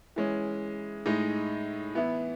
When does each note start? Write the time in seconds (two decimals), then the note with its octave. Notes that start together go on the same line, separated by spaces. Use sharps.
0.16 E3 G#3 C#4
1.06 A2 G#3 D#4
1.95 E3 B3 E4